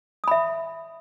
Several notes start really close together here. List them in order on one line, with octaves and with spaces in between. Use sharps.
D#6 B5 E5